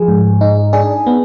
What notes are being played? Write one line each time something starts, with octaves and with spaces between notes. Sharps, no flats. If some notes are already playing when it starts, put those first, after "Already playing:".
Already playing: F3 G#4
G#2
D#4
D4 G#4
B3